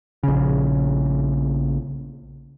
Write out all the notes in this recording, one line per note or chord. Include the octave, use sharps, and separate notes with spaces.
A#1 C#3